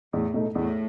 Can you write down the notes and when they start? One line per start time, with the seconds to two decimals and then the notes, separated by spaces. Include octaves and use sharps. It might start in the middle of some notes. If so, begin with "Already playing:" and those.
0.13 E2 A2
0.34 B2 A3 D#4
0.55 E2 A2